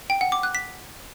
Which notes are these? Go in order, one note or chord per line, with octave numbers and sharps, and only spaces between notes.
G5
F#5
D6
F#6
B6